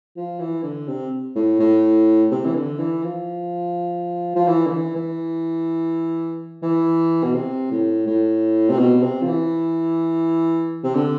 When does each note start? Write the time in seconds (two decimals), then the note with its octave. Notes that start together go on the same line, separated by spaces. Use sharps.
0.16 F3
0.40 E3
0.63 D3
0.87 C3
1.35 A2
1.59 A2
2.31 C3
2.45 E3
2.55 D3
2.79 E3
3.03 F3
4.35 F3
4.47 E3
4.66 D3
4.71 E3
4.95 E3
6.63 E3
7.23 B2
7.35 C3
7.71 A2
8.07 A2
8.70 C3
8.79 B2
9.02 C3
9.22 F3
9.27 E3
10.84 C3
10.94 D3